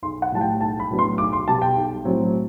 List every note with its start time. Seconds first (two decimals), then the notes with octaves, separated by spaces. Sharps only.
0.02 B1 C6
0.22 F#5
0.32 A2 G3 A5
0.41 G5
0.61 B1 A5
0.80 B5
0.90 A2 F#3 B3 D4
0.99 C6
1.18 B1 D6
1.33 C6
1.48 B2 G3 A5
1.62 G5
1.76 B1
2.05 A2 F#3 C4